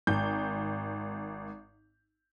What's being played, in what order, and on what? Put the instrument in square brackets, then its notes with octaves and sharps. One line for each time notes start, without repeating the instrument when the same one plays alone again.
[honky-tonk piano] G#1 G6